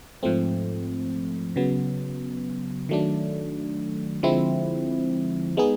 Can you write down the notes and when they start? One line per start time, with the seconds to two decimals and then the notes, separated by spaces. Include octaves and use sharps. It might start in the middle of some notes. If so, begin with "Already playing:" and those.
0.23 G#2 F3 A3 C4
1.56 C#3 F#3 B3
2.89 D#3 F#3 A3 D4
4.23 D3 F3 G#3 C4 E4
5.57 G#3 B3 D#4 G#4